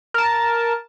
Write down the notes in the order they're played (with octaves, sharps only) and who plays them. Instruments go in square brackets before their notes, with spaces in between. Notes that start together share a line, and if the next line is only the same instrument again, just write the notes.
[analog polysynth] A#4 A5